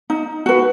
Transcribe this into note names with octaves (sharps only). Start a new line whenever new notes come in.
D#4
F#4 B4